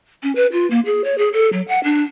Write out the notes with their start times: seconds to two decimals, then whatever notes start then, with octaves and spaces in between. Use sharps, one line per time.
0.23 C#4
0.36 B4
0.52 F4
0.71 A#3
0.86 G#4
1.04 C#5
1.18 G#4
1.33 A4
1.53 F#3
1.68 F#5
1.84 D4